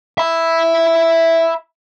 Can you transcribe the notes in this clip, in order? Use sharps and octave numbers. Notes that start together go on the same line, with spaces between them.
E5 B5